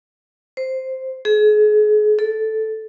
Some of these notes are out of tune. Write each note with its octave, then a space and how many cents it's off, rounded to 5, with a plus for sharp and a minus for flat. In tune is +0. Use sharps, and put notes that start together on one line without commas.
C5 +0
G#4 +35
A4 -5